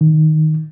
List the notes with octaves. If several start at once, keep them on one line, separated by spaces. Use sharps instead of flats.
D#3